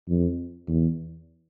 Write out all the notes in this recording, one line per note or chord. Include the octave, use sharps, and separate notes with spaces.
F2
E2